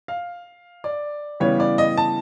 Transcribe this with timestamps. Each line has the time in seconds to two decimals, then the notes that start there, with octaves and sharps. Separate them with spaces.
0.08 F5
0.84 D5
1.40 C#3 E3 G3 B3 C#5
1.60 D5
1.78 D#5
1.97 A5